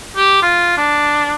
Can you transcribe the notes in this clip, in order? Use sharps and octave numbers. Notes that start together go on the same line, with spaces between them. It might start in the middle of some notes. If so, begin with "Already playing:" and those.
G4
F4
D4